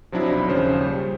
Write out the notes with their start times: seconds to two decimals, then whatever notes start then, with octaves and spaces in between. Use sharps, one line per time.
0.12 F3 F#3 C4 D4 E4
0.30 B1 B5
0.48 D#2 C#3 F3 C5 C#5
0.79 G3